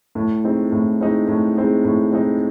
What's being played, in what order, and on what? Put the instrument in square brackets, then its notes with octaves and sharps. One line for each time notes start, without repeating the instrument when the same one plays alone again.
[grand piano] A2
G#3 C4 D#4
A2
G#3 C4 D#4
A2
G#3 C4 D#4
A2
G#3 C4 D#4